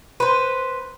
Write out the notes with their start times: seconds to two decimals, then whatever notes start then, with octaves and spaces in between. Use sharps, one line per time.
0.20 B4 C5